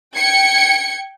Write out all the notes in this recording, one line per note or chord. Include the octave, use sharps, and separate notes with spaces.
G5 G#6 C#7